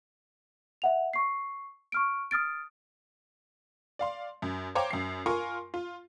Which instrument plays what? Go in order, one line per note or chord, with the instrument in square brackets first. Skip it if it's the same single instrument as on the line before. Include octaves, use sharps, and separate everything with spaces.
[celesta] E5 F#5 F7
C#6 C7
C#6 F6 D7
D#6 F6 A6 D7
[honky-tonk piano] D5 F5 C6
F#2
C5 C#5 F5 G5 A#5 D6
F#2 C7
F4 A#4 G#5 C6 C#6
F4